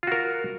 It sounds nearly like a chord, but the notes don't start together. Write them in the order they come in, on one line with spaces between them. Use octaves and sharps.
F4 F#4 A#4